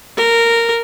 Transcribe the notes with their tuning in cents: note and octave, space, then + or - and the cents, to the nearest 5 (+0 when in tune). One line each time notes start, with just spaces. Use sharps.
A#4 -10